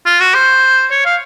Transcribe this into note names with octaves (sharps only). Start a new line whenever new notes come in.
F4
F#4
C5
C#5
F5